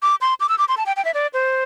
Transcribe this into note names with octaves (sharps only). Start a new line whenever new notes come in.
D6
C6
D6
E6
D6
C6
A5
G5
G5
E5
D5
C5